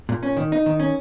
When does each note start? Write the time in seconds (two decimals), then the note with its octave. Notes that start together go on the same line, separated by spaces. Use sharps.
0.09 A#2
0.23 C#4
0.37 D#3
0.52 D#4
0.66 D#3
0.80 C#4